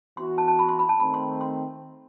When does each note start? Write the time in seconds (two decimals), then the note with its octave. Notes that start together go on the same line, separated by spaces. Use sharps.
0.17 E3 B3 F#4 C6
0.38 A5
0.48 A5
0.59 B5
0.69 C6
0.79 B5
0.89 A5
0.99 D#3 A3 C4 B5
1.14 C6
1.41 C6